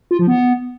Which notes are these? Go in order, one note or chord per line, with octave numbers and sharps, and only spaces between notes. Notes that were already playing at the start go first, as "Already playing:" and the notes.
F4
F3
B3